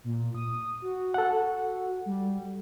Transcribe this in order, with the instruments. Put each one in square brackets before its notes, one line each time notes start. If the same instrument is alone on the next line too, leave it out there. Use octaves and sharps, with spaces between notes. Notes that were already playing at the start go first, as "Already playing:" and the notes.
[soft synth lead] A#2
D#6
F#4
[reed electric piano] A4 F#5
[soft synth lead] G3